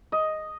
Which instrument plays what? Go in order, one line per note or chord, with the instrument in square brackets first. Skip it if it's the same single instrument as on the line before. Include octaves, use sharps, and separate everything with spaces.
[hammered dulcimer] D#5